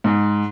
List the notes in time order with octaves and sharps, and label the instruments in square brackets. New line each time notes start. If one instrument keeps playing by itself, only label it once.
[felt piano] G#2